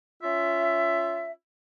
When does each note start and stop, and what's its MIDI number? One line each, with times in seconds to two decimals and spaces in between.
0.22 1.31 61
0.22 1.31 65
0.22 1.31 76